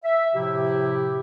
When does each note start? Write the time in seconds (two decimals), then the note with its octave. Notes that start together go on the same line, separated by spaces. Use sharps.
0.04 E5
0.34 A2 C3 F3 E4 G4